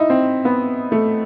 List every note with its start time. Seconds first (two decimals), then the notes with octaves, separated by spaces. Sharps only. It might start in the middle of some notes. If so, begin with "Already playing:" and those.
Already playing: D#4 E4
0.10 C4
0.45 B3
0.92 A3